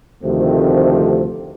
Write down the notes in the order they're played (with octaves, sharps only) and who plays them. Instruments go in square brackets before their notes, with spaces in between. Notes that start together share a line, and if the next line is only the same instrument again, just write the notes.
[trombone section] D2 C3 D#3 F3 A3 C4